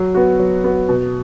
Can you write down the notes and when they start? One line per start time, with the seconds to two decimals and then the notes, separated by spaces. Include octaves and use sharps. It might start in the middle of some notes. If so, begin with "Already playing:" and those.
Already playing: F#3
0.15 B3 F#4
0.39 F#3
0.64 B3 F#4
0.89 B2